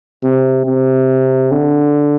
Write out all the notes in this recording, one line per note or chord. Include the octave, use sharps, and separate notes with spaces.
C3
C3
D3